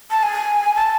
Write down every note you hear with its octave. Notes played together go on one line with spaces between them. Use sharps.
A5
G#5
A5